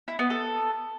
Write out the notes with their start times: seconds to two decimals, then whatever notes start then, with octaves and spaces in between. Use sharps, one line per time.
0.08 E4
0.19 B3
0.30 A4